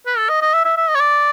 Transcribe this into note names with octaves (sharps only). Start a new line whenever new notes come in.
B4
A4
D#5
D#5
E5
E5
E5
D#5
C#5
D5